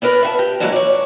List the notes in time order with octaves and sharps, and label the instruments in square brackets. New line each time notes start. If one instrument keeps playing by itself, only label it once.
[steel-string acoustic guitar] B3 D4 A#4 B4
E5 F#5 A5
G4
E3 F#3 G#3 A#3 D4
C#5 D5